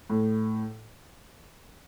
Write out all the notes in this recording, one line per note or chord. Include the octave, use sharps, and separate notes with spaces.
A2